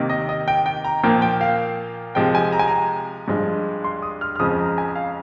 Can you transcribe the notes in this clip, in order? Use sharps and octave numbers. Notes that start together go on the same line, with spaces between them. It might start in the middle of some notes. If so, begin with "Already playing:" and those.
Already playing: C3 D#3 A#3
D#5
D#5
G5
G5
A#5
A#2 F3 A#3 G5
G5
F5
C3 F3 G#3 G5
G#5
A#5
G#5
A#5
G2 F3 G#3
C6
D#6
F6
F6
F2 C#3 F3 G#3 D#6
A#5
G#5
F5